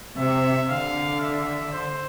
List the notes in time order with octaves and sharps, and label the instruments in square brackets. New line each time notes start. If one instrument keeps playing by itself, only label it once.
[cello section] C3 [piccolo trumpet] E5
[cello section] D3 [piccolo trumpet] F5
[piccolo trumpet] E5
C5